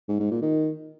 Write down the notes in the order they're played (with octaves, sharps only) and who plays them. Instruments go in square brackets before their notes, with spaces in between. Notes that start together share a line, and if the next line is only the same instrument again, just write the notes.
[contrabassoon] G#2
G#2
A#2
D#3